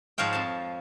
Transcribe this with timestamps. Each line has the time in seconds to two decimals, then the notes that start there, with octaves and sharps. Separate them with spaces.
0.18 G#2 F3 C#5 F5 G5
0.33 F2 A5